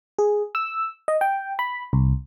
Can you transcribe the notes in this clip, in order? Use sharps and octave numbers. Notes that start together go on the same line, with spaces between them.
G#4
E6
D#5
G5
B5
C2